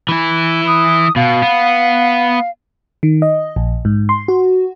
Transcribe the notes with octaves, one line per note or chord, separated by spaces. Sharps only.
E3 E4
D#6
B2 F5
B3
D#3
D#5
A#1
G#2
C6
F#4